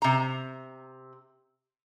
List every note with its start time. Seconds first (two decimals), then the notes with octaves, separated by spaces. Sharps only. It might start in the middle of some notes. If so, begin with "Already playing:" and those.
0.02 C3 A#5